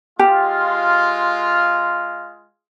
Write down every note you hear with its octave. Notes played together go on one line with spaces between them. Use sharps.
G#3 F4 G4